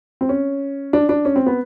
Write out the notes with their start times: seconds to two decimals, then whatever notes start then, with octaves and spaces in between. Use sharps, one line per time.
0.21 C4
0.29 C#4
0.93 D4
1.09 D4
1.25 C#4
1.36 C4
1.46 B3